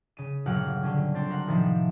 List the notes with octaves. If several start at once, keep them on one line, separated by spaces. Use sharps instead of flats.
C#3 D#7
G1 A#2 F#3 G4 F#5 F6
D3 C#4
C4 D4 A4 C5
A#4 F#5
A2 C3 D#3 F3 E4